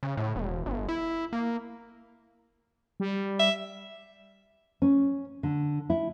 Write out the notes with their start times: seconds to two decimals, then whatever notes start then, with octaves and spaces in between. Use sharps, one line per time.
0.03 C#3
0.17 A2
0.36 E1
0.66 G1
0.89 E4
1.33 A#3
3.00 G3
3.40 E5
4.82 C#4
5.43 D3
5.90 E4